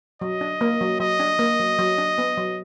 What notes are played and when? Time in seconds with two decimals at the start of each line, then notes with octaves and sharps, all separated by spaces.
0.21 F#3 D#5
0.41 D4
0.61 A#3
0.81 F#3
1.00 F#3 D#5
1.20 D4
1.39 A#3
1.59 F#3
1.79 F#3
1.98 D4
2.18 B3
2.38 F#3